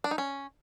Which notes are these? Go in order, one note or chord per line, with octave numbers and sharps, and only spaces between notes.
D4
D#4
C#4